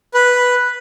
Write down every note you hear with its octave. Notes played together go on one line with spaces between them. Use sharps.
B4